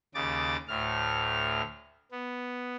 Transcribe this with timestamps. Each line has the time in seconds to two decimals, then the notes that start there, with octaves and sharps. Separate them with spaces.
0.14 D#2 C#3 D6 A6
0.68 D2 A2 F6
2.12 B3